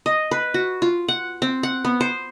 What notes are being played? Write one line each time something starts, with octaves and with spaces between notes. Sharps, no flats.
D#5
B4
F#4
F4
F#5
C4
F#5
B3
C5